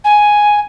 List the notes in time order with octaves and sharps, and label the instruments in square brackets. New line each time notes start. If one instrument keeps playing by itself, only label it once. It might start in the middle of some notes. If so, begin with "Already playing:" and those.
[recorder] G#5